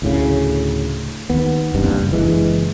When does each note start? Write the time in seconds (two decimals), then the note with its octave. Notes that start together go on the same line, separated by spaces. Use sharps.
0.02 D2 A2 C#3
1.30 D#2 B3
1.74 F#1 C2 G2
2.11 F#1 E3 G#3